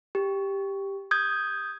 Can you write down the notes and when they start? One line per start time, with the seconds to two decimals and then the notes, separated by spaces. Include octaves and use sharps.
0.15 G4
1.11 D#6 G6 G#6